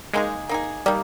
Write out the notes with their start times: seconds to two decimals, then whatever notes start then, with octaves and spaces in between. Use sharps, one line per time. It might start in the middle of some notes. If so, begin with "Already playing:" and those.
0.13 G#3 A#3 D#4 G#4
0.49 A#3 D#4 G#4
0.86 G3 A#3 D#4